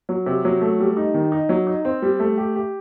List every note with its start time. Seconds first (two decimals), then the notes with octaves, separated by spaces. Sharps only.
0.09 F#3
0.26 C3
0.45 F#3
0.61 A3
0.80 G3
0.97 D#4
1.14 D#3
1.32 D#4
1.49 F#3
1.67 D#4
1.85 C4
2.02 G3
2.19 A3
2.38 G4
2.56 G4